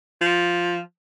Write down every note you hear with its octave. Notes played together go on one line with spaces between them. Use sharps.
F3